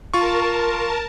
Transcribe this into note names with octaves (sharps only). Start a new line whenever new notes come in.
F4 A#4 A5 C#6